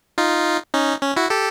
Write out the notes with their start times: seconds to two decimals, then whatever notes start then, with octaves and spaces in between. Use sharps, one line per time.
0.18 D#4 F4
0.74 C#4 D#4
1.02 C#4
1.17 E4 F#4
1.30 G4 A4